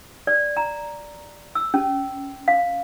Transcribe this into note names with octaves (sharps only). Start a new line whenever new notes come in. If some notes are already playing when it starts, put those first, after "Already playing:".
D5
A#5
E6
C#4
F5